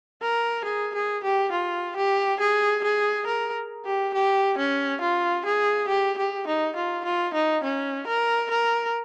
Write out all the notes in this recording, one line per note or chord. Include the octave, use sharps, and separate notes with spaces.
A#4
G#4
G#4
G4
F4
G4
G#4
G#4
A#4
G4
G4
C#4
F4
G#4
G4
G4
D#4
F4
F4
D#4
C#4
A#4
A#4